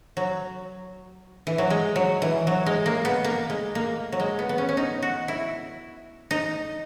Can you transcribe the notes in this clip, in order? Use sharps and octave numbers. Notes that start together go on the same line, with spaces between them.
F#3
E3
F#3
G#3
F#3
E3
F#3
G#3
A#3
B3
A#3
G#3
A#3
F#3
G#3
B3
B3
C#4
C#4
D#4
F#4
E4
D#4